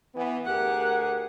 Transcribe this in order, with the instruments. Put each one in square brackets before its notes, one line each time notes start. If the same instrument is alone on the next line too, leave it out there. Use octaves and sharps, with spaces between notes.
[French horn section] E3 B3
[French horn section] D2 G#4 A#4 [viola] G4 F#5